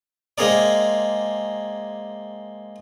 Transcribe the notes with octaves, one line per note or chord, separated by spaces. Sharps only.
G#3 A#3 C4 G#4 A#4 D5